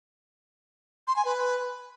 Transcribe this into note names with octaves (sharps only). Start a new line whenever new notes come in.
C6
G#5
B4